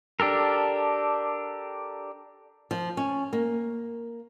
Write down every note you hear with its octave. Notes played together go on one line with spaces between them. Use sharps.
D4 G4 A4 A#4
F3
C#4
A#3